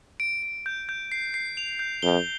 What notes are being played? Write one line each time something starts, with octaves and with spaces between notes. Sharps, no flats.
D7
D7
G6
G6
C7
C7
F7
G6
F2 G7